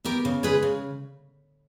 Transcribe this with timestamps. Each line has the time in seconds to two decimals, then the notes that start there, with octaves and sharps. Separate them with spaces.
0.05 B3 G4 A#4
0.25 C#3
0.43 G#3 G#4 B4
0.63 C#3